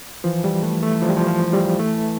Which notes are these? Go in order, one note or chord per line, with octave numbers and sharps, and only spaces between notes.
E3 F3
G3
A3
A3
F3
G3
F3
F3
G3
A3